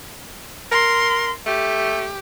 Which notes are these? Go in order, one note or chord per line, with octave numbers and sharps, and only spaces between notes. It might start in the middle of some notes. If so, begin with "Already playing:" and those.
A#4 C6
A3 G4